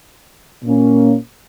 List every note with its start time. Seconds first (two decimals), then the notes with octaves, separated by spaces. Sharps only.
0.63 A#2 A#3 C#4